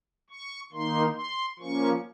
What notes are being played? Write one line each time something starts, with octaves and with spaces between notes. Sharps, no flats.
C#6
D#3 A#3 D#4 C6
C6
F3 A#3 C#4 C#6